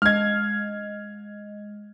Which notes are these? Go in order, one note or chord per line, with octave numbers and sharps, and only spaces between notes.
G#3 D#5 F6 G#6